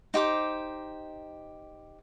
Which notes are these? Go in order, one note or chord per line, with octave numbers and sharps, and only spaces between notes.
D#4 G4 C5 D6